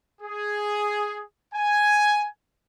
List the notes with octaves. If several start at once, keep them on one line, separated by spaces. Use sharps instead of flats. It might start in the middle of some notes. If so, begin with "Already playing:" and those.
G#4
G#5